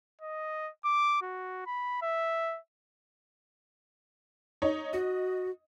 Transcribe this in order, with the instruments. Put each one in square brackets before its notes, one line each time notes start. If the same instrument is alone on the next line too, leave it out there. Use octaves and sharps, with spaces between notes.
[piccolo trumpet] D#5
D6
F#4
B5
E5
[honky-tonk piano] D#4 C#5
[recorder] F#4 [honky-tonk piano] D#5